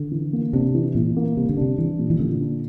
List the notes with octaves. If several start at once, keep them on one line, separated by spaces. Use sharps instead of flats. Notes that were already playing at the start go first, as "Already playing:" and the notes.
Already playing: D3
E3
A#3
C3 D4
E3
A#2 E3
A#3
C3 G3
D3
C3 D4
E3 G3
A#2
E3
A#2 D3
D4